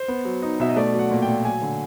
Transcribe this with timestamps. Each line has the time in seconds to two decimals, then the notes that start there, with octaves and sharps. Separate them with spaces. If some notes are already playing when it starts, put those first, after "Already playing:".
Already playing: C5
0.08 B3
0.25 F#3
0.42 D#4
0.60 B2 E5
0.69 D#5
0.76 A3 D5
0.94 F#3 F#5
1.11 A#2
1.22 G5
1.28 A#2
1.45 F#3 G#5
1.62 D3